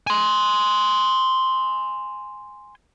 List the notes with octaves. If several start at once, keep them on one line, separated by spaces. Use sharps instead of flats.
G#5 C6